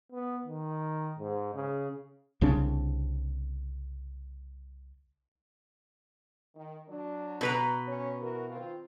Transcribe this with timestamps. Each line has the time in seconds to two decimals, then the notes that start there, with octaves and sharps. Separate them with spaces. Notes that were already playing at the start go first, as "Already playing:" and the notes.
0.12 B3
0.45 D#3
1.19 G#2
1.55 C#3
2.41 C2 C#3 C4 D4
6.55 D#3
6.88 F#3 D4
7.41 B2 B4 A#5
7.86 C#4 C#5
8.20 E3 F#4 A#4
8.50 D#3 C4 F4